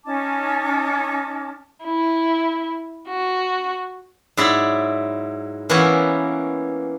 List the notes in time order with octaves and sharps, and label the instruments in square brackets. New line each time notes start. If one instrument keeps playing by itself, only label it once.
[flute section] C#4 D#4 A5 D6
[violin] E4
F#4
[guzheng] G#2 F#3 E4 D5 B5
E3 A#3 B3 C#4 E4 F#4